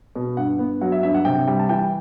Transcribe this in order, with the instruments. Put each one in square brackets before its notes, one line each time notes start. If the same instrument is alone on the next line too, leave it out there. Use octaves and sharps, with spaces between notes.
[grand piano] B2
G2 F#5
B3
F#3 F#5
E5
G2 E5
F#5
C3 G5
G3 G5
A5
E3 G5